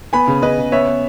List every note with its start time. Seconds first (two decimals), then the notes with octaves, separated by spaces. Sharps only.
0.13 B3 G#5 B5
0.28 C#3
0.42 C#3 B4 D#5
0.58 C#3
0.72 B3 C#5 E5
0.87 B3